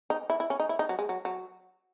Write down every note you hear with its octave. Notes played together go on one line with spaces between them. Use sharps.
D#4
E4
E4
C#4
D#4
E4
D#4
F#3
G#3
F#3
F#3